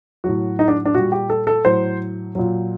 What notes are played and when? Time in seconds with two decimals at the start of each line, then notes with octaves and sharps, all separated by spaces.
0.24 A2 F#3 F#4
0.59 D#4
0.68 D4
0.85 D4
0.94 A#2 G3 F#4
1.12 G4
1.30 A4
1.47 A4
1.65 A2 F#3 C5
2.35 A#2 F#3